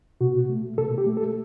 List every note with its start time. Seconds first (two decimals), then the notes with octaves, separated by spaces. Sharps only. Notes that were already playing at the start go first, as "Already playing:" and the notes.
0.21 B2 F#4
0.50 A3
0.78 B2 A4
0.98 G4
1.07 A3
1.17 A4